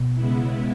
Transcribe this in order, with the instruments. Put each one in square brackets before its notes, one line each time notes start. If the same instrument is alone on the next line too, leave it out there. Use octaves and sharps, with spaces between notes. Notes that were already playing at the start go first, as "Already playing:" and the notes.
Already playing: [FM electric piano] B2
[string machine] C#3 G#3 B3 E4